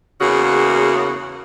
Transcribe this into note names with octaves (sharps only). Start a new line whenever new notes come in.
E2 C#3 A#3 F#4